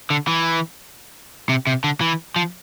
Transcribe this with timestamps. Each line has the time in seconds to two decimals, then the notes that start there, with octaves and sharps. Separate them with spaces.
0.10 D3
0.28 E3
1.49 C3
1.67 C3
1.84 D3
2.01 E3
2.36 F3